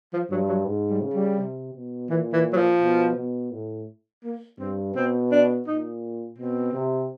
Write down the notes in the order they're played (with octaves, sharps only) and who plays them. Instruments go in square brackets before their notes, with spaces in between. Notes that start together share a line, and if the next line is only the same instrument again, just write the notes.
[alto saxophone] F3
[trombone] G2 [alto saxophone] F#3
[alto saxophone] F#3
[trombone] G#2
[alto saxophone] G3
[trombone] C#3
[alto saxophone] G3
[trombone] C3
B2
[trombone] A#2 [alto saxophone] E3
[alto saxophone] E3
F#3
F3
[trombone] B2
B2
A2
[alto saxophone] A#3
[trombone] G2 [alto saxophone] C4
[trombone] B2 [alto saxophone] C4
[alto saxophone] D4
[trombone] A#2 [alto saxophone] D#4
[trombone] B2 [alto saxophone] C4
[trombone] C3